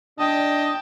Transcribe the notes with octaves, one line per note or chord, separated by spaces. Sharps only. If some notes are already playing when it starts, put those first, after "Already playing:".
D4 D#5 G5 A5